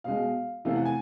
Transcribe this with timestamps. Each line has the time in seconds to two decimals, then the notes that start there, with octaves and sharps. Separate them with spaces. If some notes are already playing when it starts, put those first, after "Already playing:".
0.04 B2 G#3 F5
0.65 C3 E3 A3 F5
0.76 F#5
0.85 G#5